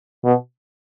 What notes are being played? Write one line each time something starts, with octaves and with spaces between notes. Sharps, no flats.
B2